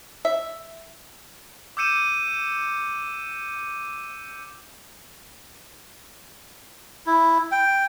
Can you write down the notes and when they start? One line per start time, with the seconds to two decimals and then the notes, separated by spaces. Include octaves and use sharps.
0.25 E5
1.77 D6 E6 G6 C#7 D#7 E7
7.07 E4
7.52 G5